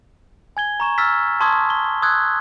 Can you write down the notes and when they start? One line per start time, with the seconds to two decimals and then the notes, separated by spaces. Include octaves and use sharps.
0.57 G#5 G#6 G7
0.80 A#5 C#6 E7
0.98 E6 F6 A6 B6
1.40 A5 C6 C#6 D#6 E6 G#6
1.70 G7
2.02 C6 D#6 E6 F#6 G#6